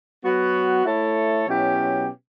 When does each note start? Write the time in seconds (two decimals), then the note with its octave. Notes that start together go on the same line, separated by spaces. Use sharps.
0.24 F#3 B3 F#4
0.85 A3 E4 A4 C#5
1.47 B2 F#3 C#4 E4 G4